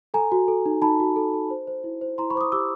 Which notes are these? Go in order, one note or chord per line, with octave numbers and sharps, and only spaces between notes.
A4 G#5 A#5
F#4
A4
D#4
D#4 A5 B5
F#4
A4
A4
C5
C5
E4
C5
E4 A#5 C6
B5 C#6
C5 D6
C#6 D#6
G4 D6 E6